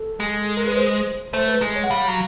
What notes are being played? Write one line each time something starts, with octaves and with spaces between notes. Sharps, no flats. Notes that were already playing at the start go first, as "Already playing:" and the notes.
Already playing: A4
G#3
A#4
B4
C5
A3 C5
B4
G#3
C#5
F#5
G3 F5
F#3